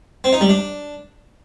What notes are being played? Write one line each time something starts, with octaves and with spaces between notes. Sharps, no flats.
C4
D#4
G3
D4